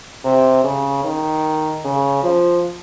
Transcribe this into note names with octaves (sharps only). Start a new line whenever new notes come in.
C3
C#3
D#3
C#3
F3